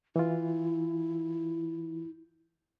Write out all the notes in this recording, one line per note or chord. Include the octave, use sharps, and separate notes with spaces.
E3 E4 F4